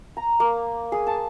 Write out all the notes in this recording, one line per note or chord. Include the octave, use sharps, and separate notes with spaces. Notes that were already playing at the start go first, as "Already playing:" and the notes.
A#5
A#3
G#4
A5